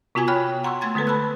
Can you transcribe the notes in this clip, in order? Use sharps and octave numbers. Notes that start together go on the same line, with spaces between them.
C3 B3 F4 F#4 G#5 G#6
C#5 G5 B5 F6 F#6
F#5 A#5 C6 C#6 E6
A3 C6 G#6 A6
D3 G#3 B3 A4 B4
A5 B5 E6 F#6